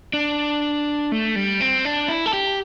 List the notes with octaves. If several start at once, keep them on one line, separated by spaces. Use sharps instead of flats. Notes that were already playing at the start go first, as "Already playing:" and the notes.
D4
A3
G3
C4
D4
E4
A4
G4